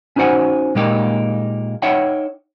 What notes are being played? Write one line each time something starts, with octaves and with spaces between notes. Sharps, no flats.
C#4 D#4 F#4 C5 F#5 G#5
A#2 G#3 A#3 D#4 G4
D#4 C#5 E5 F#5 G5